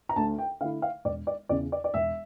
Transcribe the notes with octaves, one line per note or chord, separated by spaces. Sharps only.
A#5
D2 A5
G5
D3 A3 E4 F5
F5
E1 D5
D5
E2 C#3 D5
D5
D5
E1 E5